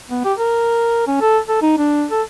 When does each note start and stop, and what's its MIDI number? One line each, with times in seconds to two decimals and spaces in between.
0.09 0.24 59
0.24 0.33 67
0.38 1.05 70
1.07 1.16 61
1.21 1.38 69
1.48 1.58 69
1.62 1.75 63
1.78 2.05 62
2.11 2.22 69